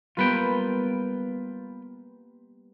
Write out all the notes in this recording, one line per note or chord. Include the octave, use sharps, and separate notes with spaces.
G3 A#3 B3 F4 B4 G5